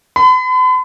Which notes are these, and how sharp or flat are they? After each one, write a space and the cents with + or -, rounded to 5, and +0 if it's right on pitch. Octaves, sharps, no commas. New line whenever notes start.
B5 +45